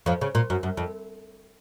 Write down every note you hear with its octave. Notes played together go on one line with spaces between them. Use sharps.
F2 F3
C#3
A#2
F#2
F#2
F2